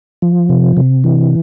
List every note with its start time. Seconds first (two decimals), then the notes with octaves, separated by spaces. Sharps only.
0.22 F3
0.49 C3
0.77 C3
1.04 E3